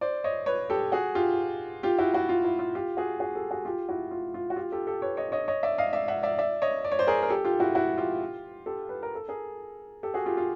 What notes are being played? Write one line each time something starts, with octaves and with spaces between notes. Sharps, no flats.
C5 D5
C#5 D#5
B4 C#5
G4 A4
F#4 G#4
F4 G4
F4 G4
E4 F#4
E4 F#4
F4
E4
F4
F4 G4
F#4 G#4
F#4 G#4
G4 A4
F#4 G#4
F4 G4
E4 F#4
F4
F4
F#4
F4 G4
G4 A4
G4 A4
B4 C#5
C#5 D#5
C#5 D#5
C#5 D#5
D5 E5
D#5 F5
D5 E5
E5 F#5
D5 E5
D5 E5
C#5 D#5
D5
C#5
C5 D5
G#4 A#4
A#4
G4 A4
F4 G4
E4 F#4
E4 F#4
F4 G4
G4 A4
B4
A#4
A4
G#4 A#4
G4 A4
F#4 G#4
F4 G4
F4